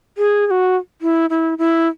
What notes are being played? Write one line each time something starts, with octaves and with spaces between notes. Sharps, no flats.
G#4
G#4
F#4
E4
E4
E4